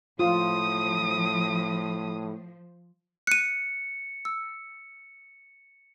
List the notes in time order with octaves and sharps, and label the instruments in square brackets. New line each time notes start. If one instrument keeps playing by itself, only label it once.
[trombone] A2 [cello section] F3 [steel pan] F4 [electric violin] D#6
[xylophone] F#6 D#7 [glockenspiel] C#7
[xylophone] E6